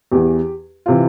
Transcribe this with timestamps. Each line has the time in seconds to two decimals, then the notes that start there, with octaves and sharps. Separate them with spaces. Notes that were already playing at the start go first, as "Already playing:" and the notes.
0.12 E2 E3 G4
0.86 C3 E3 F4